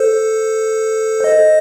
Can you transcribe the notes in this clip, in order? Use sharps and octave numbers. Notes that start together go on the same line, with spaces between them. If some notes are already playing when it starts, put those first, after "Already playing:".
Already playing: A4 C5
C5 D#5